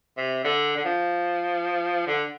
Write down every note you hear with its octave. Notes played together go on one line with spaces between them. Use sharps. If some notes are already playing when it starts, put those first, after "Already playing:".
C3
D3
D3
F3
D3